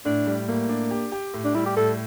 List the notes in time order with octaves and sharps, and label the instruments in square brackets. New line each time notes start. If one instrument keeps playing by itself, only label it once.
[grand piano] A2 [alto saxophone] D4
[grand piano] G3
[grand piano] A2 [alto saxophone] A#3
[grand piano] D4
G4
G4
A2
[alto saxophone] D4
[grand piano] G3 [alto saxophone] E4
[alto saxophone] G4
[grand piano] A2 [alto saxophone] A4